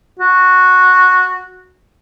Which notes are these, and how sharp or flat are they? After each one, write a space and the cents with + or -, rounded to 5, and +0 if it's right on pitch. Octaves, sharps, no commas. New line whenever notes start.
F#4 -10